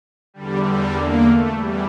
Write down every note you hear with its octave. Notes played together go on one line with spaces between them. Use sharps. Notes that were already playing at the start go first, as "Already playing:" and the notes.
E2 D3 G3
G3
A#3
A3
E2 E3 G3